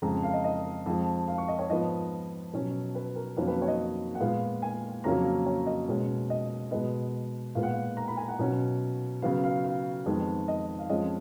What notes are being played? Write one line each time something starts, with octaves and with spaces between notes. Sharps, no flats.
F2 C#3 G#3 A#5
F5
D#5
D#5
F2 F3 G#3
F5
C#6
D#5
C#5
G#2 F3 B3 D#5
B2 F#3 C#4
B4
A#4
F2 D#3 F#3 A#3 C#4 B4
B4
C#5
D#5
F#5
A#2 G#3 B3 F5
G#5
F2 C#3 F#3 A#3 C#4 A#5
C#5
D#5
B2 G#3 C#4
D#5
B2 G#3 B3 D#5
A#2 G#3 B3 F5
F#5
F5
A#5
B5
G#5
F#5
B2 F#3 C#4
C#3 F#3 B3 F5
F5
F5
F2 D#3 G#3 B3
D#5
F5
F2 F3 G#3 C#4 D#5